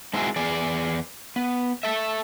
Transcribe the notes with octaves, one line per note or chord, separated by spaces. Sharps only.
G#3 C4 D#4 E4 F#4 G#4
E2 G#4 D5
B3
A4 E5